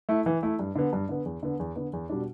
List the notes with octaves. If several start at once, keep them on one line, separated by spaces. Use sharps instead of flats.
A3 E4
E3
A3 E4
G2
D3 B3
G2
D3 B3
E2
D3 B3
E2
D3 B3
E2
B2 G3 D4